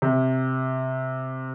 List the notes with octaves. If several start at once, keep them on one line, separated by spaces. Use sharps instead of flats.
C3